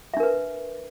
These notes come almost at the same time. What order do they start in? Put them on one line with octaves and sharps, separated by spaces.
E5 D4 A#4 B4